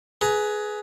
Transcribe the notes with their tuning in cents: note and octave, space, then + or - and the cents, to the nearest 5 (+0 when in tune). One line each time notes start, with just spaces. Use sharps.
G#4 +15 B4 +0 A#5 +0